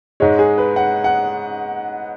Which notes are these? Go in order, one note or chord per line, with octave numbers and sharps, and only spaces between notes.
G#2 G#3 C#5
G#4
B4
F#5
F#5